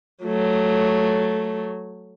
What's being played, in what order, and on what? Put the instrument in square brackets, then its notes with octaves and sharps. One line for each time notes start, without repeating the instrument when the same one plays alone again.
[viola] F#3 A3